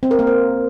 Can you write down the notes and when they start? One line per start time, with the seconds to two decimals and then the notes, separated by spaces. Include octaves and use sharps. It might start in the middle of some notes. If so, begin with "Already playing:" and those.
0.03 C4
0.11 A#4
0.19 A#3
0.27 C5